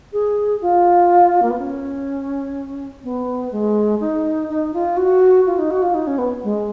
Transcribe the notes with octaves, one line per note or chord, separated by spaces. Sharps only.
G#4
F4
A#3
B3
C#4
B3
G#3
D#4
D#4
F4
F#4
F4
D#4
F#4
F4
D#4
C#4
B3
G#3